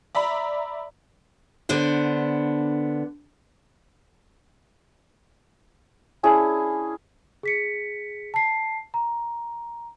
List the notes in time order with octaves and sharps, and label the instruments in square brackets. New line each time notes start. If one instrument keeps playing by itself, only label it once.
[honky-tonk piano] D5 E5 A#5 B5
[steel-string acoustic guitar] D3 B3 D4 C5
[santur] C#4 D4 E4 G#4
[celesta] G#4 B6 C#7
A5 C7
A#5